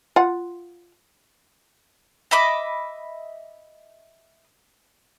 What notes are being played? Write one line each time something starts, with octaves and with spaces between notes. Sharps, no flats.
F4 F#5
D#5 E5 B5 D6